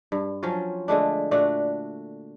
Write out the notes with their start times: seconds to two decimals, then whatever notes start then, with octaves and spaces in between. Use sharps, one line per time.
0.12 G2
0.43 F3 F#3 C#4 F4
0.88 D3 G#3 A3 D4
1.31 A#2 A3 D4 F#4